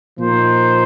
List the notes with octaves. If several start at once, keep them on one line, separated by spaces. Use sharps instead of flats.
A#2 F3 A#3 D#4 C5